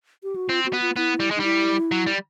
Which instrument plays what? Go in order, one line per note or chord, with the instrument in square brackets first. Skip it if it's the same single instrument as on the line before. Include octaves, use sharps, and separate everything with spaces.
[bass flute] G4
F#4
[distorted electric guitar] C4 [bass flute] F4
[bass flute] F#4
[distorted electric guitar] B3
[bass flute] F4
[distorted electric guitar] B3 [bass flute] E4
[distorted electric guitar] G3
G#3
[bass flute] D#4
[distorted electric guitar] G3 [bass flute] E4
[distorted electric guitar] F#3
G3